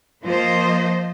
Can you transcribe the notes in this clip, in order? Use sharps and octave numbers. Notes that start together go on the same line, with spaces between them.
F3 A#3 F4 C5 D#5